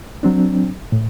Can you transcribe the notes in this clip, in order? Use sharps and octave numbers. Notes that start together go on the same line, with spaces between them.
F#3 C4 D4
A2